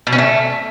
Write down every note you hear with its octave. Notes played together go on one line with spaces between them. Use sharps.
B2
C#4
A3